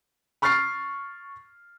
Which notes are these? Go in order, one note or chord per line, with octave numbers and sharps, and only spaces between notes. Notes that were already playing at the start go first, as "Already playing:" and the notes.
B5 C#6 F6 A6 C7